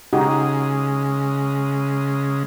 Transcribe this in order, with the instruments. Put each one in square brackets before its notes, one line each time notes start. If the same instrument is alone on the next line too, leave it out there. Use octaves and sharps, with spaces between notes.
[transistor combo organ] C#3 G#3 [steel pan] D#4 F#4 G4